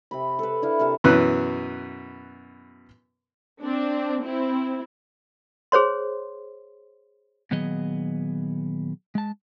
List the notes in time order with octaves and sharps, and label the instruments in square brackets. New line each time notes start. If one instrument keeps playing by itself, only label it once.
[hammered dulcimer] C3 C4 B5
A4 B4
D4 E4 F5
C3 A#4 E5 A5
[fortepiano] F#2 B2 E3 B4 F#6
[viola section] C4 D4
C4 E4
[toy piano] G#4 C5 C#5 C6
[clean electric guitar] A#2 D#3 F#3 B3 G#4 D#5
G#3 A5